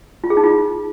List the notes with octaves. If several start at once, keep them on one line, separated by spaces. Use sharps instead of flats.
F4
G#4
D#4
F4